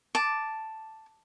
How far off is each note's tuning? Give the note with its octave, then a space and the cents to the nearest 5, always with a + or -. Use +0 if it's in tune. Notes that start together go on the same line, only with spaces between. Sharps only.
A5 +0 D6 +0